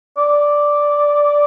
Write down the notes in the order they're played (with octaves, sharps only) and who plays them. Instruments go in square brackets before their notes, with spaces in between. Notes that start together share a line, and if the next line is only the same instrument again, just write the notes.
[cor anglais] D5